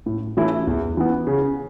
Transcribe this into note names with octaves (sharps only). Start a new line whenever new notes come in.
A2
E3 A3 C#4 E4
E2
E3 B3
C#3